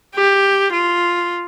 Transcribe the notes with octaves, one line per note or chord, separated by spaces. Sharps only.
G4
F4